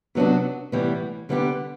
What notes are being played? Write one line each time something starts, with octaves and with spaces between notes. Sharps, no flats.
C3 F#3 B3 D4 F#4
A2 E3 G3 B3
D3 G3 B3 E4 G4